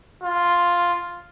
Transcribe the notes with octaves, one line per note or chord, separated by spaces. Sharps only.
F4